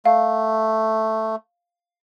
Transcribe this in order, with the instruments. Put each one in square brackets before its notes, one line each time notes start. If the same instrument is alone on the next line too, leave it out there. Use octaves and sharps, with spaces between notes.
[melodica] A3 [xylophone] F5